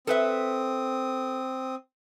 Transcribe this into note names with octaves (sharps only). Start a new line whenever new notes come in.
C4 A4 B4 E5 D#6